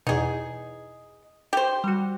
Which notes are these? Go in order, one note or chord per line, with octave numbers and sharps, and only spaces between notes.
E2 B2 D#4 G#4
G4 C5
G3 F#4